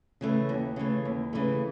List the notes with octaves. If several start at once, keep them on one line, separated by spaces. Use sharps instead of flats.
C#3 E3 A3
D#2
C#3 E3 A3
D#2
C#3 E3 A3